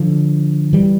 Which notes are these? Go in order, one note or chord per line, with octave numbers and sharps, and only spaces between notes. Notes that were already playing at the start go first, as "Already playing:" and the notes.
Already playing: D3 F3
E3 G3